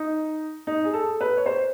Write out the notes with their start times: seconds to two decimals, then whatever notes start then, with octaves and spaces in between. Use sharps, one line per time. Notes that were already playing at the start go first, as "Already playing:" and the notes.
Already playing: D#4
0.67 D#4
0.84 G#4
0.93 A4
1.21 B4
1.37 C#5
1.46 C5